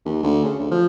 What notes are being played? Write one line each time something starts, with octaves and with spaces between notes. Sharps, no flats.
D#2
D2
C#3
D2
F3